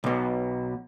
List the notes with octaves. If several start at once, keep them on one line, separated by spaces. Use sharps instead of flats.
B1 B2